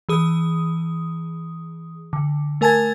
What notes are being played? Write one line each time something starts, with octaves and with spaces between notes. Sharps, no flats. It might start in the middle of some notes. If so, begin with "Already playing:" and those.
E3 G#4 D#6
D3
A3 A#4 G#5 A5 G#6 A6